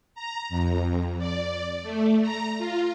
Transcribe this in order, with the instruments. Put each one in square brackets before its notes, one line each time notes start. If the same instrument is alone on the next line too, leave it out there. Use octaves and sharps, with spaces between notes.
[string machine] A#5
F2
D5
A3
A#5
F4